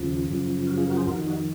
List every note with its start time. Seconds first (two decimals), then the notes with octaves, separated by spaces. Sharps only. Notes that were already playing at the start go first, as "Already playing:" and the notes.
Already playing: D#2 C#3 F3
0.28 F#2 C#3 F3
0.67 F#4 A#4
0.77 F4 G#4
0.87 F#4 A#4
0.97 G#4 C5
1.07 F2 F#4 A#4
1.12 D#3
1.26 D#4 F#4